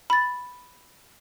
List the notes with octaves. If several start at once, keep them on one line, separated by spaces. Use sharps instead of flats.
B5 A6